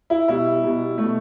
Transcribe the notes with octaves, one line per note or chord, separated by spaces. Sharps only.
E4
B2 G3 E4
B2 G3
B2 A3